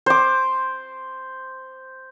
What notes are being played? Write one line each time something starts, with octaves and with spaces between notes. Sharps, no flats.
C5 D6